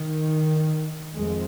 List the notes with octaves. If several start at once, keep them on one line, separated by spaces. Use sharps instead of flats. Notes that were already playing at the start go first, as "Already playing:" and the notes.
Already playing: D#3
F2 G#3